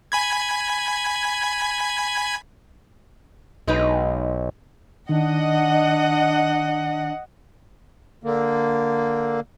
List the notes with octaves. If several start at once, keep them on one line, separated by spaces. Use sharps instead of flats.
G#5 B5 G#6
B1 G#3 D#4 B4
D#3 D4 D#5 F#5
D3 A#3